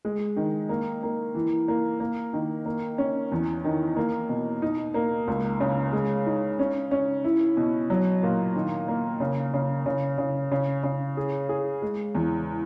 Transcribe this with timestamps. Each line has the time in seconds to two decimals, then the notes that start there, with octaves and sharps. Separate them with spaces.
0.05 G#3
0.36 D#3
0.69 A#3
1.03 A#3
1.35 E3
1.68 A#3
2.00 A#3
2.33 D#3
2.66 A#3
2.98 C#4
3.32 E2
3.64 D#3
3.97 A#3
4.29 B2
4.62 D#4
4.94 A#3
5.28 C#2
5.60 C#3
5.93 G#3
6.26 D#4
6.59 C#4
6.91 C#4
7.24 E4
7.57 B2
7.90 F#3
8.23 A#2
8.56 D#3
8.88 A#3
9.20 C#3
9.54 C#3
9.86 C#3
10.18 C#3
10.51 C#3
10.83 C#3
11.17 G#4
11.49 G#4
11.82 G#3
12.15 E2